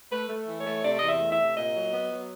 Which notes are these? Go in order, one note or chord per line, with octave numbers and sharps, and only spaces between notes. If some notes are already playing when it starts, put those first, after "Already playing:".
A3 B4
A3
E3
C#5
A3
C3 D5
E2 D#5
E5
A3
E5
C3
A#2 D#5
F#3
B3
F#3